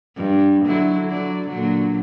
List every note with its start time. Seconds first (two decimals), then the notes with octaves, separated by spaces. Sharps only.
0.16 G2
0.65 D3 F#3 E4
1.09 D3 F#3 D5
1.49 A#2 D3 F#3